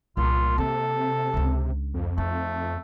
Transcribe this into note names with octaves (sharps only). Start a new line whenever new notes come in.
C2 A#2 F4
C3 A#3 A4
C#2 D4
F2
A3 D#4